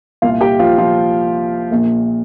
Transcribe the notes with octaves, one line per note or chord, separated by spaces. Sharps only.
C2 A#2 F4 F5
G4 G5
F3 F4
F3 F4
A#1 A#2